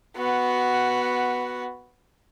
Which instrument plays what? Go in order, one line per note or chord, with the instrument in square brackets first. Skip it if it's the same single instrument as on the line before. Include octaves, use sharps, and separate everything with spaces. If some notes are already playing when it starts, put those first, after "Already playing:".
[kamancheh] B3 F#4